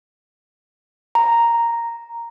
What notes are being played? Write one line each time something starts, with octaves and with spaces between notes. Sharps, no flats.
A#5